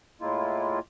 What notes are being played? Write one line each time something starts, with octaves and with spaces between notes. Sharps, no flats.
A2 G#3 A#3 E4 F4